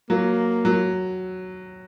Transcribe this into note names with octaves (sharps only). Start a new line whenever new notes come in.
F#3 A#3
F#3